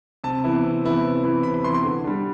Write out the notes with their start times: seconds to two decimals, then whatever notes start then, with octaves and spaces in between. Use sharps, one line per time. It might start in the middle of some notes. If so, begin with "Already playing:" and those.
0.24 C3 A5
0.44 E3 B3 E4
0.64 C3
0.84 E3 B3 E4
1.03 C3
1.24 E3 B3 E4
1.43 C3 B5
1.54 B5
1.63 E3 B3 E4 C6
1.74 C6
1.83 D3
2.04 G3 D4